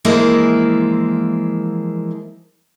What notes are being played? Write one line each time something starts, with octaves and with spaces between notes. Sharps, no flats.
E3 F3 G#3 A#3 E4